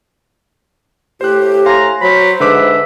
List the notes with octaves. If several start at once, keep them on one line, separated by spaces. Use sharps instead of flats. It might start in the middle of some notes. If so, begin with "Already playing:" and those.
A2 G4 C5 F#6
F5 G#5 A#5 C6
F#3 C5 B5
G#2 D3 B4 E5 D6